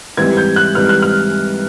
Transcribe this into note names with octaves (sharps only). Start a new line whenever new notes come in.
G#2 E3 G3 C4 G#6
G6
F#6
G#2 E3 G3 C4 F6
F#6
F6